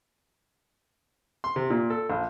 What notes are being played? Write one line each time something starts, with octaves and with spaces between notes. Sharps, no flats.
C6
C3
A#2
A4
A#1